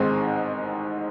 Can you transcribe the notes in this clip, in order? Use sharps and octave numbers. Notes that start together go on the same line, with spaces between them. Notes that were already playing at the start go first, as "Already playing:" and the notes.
Already playing: A1 G#2 D#3 G#3 C4